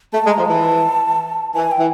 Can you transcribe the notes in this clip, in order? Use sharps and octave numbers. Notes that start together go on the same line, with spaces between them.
A3 A5
G#3
A#5
F3
E3 A5
E3 G#5
G5
E3